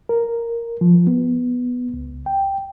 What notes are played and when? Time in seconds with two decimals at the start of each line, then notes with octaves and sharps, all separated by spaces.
0.09 A#4
0.81 F3
1.07 B3
1.94 C#2
2.26 G5